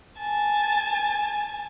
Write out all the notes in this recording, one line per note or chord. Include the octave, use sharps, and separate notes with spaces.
G#5 A5